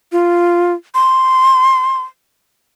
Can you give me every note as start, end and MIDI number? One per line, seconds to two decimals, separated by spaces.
0.12 0.73 65
0.95 2.02 84